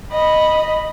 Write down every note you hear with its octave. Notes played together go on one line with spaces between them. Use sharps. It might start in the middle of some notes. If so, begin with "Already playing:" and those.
D#5 B5